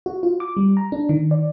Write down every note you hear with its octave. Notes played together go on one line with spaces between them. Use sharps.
F#4
F4
D6
G3
A#5
D4
D#3
D5